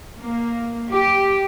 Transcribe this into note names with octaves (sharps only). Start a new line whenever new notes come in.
A#3
G4